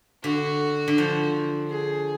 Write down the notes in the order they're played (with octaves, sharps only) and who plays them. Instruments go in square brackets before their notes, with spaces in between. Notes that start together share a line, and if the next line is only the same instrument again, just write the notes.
[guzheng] D3 [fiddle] F#4
[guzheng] D3
F3
[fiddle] G#4